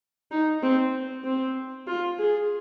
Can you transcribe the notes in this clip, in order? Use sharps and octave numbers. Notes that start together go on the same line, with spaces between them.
D#4
C4
C4
F4
G#4